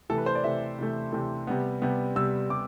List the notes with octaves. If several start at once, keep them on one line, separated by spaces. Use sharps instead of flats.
C3 E3 A3 A4
B4
C5
D5
C3 E3 A3 E5
C3 E3 A3
C3 E3 A3
C3 G3 B3
C3 G3 B3
C3 G3 B3 E6
C3 G3 D6